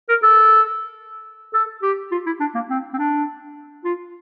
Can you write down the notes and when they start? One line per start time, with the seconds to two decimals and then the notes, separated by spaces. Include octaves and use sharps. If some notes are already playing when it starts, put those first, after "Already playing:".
0.09 A#4
0.23 A4
1.54 A4
1.82 G4
2.11 F4
2.26 E4
2.40 D4
2.55 A#3
2.70 C4
2.94 C4
2.98 D4
3.85 F4